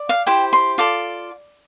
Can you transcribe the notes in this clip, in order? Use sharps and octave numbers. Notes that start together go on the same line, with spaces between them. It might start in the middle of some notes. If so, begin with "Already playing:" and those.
Already playing: D5
F5
E4 G4 C5 G5
C6
F4 A4 D5 D6